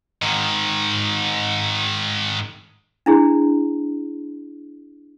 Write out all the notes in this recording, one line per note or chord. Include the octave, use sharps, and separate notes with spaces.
G#2 D#3
D4 E4 G#4